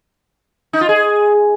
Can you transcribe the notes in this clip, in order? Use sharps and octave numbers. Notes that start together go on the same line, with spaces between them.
D#4
F4
G#4